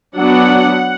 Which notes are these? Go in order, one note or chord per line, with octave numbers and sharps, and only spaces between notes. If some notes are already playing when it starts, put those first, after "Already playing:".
F#3 B3 D4 F#5